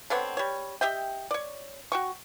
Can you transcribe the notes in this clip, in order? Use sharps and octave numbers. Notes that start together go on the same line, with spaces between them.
D3 B3 C4 C#5
G3 C#5
G4 D#5 E5 G5
C#5 D5
F#4 G5 C#6